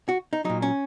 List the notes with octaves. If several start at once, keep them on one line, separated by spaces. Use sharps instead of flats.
F#4
D#4
A#2 F#3 D#4
C#4